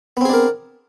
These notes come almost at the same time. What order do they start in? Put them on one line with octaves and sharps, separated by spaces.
B3 C4 G#4 D4 A#4